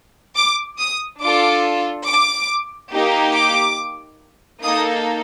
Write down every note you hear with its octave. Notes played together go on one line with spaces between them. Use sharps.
D6
D#6
D4 F4 A4 D6
D6
A#3 D#4 G4
D6
A#3 D#4 A4 D#6